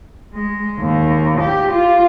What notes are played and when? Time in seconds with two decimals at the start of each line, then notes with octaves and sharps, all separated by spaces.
0.34 G#3
0.80 D#2
1.41 G4
1.72 F4